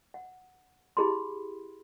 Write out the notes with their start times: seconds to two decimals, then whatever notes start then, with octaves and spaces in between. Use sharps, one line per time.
0.14 F#5
0.97 E4 G4 G#4 B5 C6